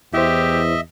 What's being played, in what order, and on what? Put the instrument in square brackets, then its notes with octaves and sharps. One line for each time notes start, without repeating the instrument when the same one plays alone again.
[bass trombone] E2 [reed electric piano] E4 C5 [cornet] G4 [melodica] D#5 E5